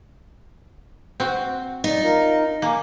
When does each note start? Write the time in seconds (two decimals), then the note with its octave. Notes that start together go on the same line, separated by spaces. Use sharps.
1.20 C4 F#4
1.84 D#4 D5
2.02 F4 A#4
2.62 A#3 G#5 C#6 D6